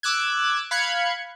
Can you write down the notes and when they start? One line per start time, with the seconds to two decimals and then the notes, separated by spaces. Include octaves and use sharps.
0.03 D6 E6 F#6 G#6
0.71 F5 B5 F#6 G#6 C#7